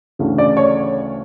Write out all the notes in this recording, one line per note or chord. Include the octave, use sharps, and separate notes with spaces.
D2 C#3 E3 A3
D5
C#5